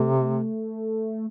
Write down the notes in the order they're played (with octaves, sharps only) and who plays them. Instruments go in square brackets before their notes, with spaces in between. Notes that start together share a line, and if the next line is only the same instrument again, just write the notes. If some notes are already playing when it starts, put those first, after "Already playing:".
Already playing: [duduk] C3 [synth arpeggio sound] A3